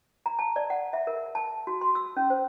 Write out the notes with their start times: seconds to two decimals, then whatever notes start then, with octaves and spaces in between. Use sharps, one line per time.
0.26 A#5
0.39 A5
0.56 D5
0.70 F#5
0.93 E5
1.07 A#4
1.35 A5
1.67 F#4
1.81 C6
1.95 E6
2.17 C#4
2.30 C5